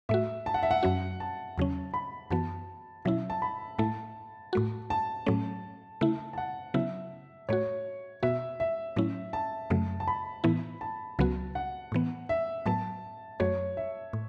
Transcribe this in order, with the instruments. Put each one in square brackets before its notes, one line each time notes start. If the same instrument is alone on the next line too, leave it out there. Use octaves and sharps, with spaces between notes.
[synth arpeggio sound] A2 A3 F#4 [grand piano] E5
[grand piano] A5
F#5
E5
F#5
[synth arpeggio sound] F#2 F#3 C#4 F#4
[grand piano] A5
[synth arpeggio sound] E2 C#3 F#3 C#4
[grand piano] B5
[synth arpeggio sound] F#2 E3 B3 F#4 [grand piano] A5
[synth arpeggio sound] B2 F#3 C#4 E4 [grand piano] E5
[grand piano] A5
B5
[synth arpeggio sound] A2 A3 E4 [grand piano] A5
[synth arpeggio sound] A2 A3 F#4
[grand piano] A5
[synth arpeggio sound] A2 F#3 A3 C#4
C#3 A3 E4
[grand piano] A5
F#5
[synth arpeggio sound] C#3 F#3 B3 E4 [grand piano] E5
[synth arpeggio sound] A2 A3 F#4 [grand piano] C#5
[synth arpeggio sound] B2 B3 F#4 [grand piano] E5
[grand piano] E5
[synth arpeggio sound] A2 F#3 A3 C#4 E4
[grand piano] A5
[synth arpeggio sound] F#2 C#3 F#3 A3
[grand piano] A5
B5
[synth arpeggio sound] A2 E3 B3 E4
[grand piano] A5
[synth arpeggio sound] C#2 C#3 F#3 B3 F#4
[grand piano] F#5
[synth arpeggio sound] A2 E3 B3
[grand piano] E5
[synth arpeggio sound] A2 F#3 B3 [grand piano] A5
[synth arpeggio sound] F#2 F#3 A3 F#4 [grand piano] C#5
[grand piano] E5
[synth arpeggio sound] A2